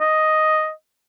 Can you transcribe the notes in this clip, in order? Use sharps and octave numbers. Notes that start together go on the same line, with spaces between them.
D#5